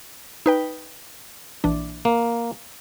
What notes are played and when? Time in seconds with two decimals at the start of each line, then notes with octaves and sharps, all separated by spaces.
0.46 D#4 B4 G5
1.64 A#1 E3 D4
2.05 A#3